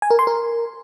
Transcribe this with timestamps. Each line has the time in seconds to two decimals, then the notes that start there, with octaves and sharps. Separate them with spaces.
0.02 G#5
0.11 A#4
0.19 C6
0.27 A#4